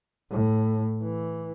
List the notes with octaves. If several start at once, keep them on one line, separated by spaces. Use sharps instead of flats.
A2
E3